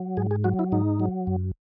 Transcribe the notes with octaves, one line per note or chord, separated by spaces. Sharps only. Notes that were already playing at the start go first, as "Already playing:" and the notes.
Already playing: F#3
G#2 G#4
G#4
F#3 F#4
E4
G#2 D#4
F#3
F#2